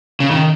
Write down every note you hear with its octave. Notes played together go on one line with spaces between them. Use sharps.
C#3
D#3